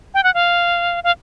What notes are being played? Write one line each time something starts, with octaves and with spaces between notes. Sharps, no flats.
G5
F#5
F5
F5